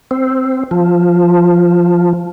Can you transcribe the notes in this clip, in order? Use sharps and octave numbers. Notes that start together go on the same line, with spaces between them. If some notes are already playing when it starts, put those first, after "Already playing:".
C4
F3